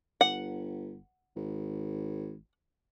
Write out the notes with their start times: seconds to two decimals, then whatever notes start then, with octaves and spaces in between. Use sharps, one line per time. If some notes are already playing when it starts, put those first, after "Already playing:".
0.21 G1 F#5
1.36 G#1